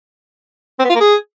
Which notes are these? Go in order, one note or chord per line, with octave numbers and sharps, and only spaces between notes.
C4
B3
F4
A#3
G#4